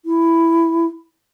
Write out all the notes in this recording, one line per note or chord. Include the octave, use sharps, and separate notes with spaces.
E4